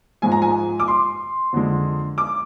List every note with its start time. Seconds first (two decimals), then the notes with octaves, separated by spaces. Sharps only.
0.22 G#2 F3 G#3 G#5
0.32 A#5
0.42 G#5
0.80 D6
0.88 C6
1.53 F2 D3 G#3
2.18 D6